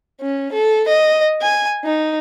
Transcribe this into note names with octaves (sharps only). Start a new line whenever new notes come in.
C#4
A4
D#5
G#5
D#4